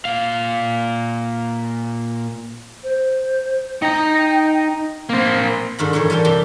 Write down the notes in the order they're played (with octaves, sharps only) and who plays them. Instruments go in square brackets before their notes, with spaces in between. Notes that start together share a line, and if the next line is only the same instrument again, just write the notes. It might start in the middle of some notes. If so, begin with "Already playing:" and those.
[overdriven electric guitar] A#2 F5
[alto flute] C5
[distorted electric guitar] D#4 A#5 [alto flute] G5
[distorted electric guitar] A#3 C5 [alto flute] C4
[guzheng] G#2 D3 D#3 B5
A#2 D3 E3 C#5
G3 A#3 F4 A4 G5
C3 E3 G4